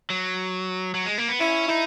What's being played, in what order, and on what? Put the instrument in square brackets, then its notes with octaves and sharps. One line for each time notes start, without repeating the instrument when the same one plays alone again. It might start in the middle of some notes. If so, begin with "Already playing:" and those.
[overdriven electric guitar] F#3
F#3
G#3
A#3
B3
[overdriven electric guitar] C#4 [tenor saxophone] E4
[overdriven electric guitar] D#4 [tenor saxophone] E4